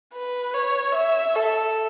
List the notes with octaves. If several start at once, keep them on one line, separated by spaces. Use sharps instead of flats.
B4
C#5
E5
A4